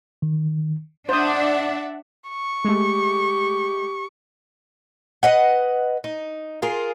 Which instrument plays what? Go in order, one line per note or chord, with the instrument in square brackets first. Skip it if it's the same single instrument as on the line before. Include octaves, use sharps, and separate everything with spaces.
[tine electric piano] D#3
[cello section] D4 [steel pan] C5 D#6 [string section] D5 E5 F#5
[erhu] C#6
[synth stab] G#3 A3 [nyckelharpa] G4
[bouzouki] B4 D#5 F#5
D#4
F4 G#4 A#4